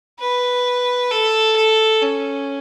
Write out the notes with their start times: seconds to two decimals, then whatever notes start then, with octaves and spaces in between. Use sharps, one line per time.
0.20 B4
1.11 A4
1.56 A4
2.02 C#4